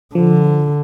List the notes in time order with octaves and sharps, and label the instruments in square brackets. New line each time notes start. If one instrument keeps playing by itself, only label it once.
[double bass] D3 [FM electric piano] F3